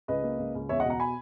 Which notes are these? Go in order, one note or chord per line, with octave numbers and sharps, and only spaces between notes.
C#2 B4 D#5
A#3
C#2
C#2
E2 C#5 E5
D#5 F#5
B2
F#5 A#5
G#5 B5